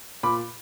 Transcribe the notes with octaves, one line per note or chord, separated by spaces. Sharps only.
A#2 B5 D6